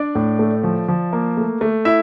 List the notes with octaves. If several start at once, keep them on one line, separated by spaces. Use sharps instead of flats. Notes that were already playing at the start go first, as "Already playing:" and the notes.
Already playing: D4 D5
A2
A3
F3
F3
A#3
A3
A3
E4 E5